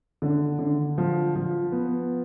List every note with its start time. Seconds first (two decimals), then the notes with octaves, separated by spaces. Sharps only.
0.22 D3
0.59 D3
0.98 F3
1.35 F3
1.72 B3